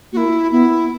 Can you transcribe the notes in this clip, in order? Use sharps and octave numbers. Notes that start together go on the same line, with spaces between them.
A#3 E4 F#4
B3 E4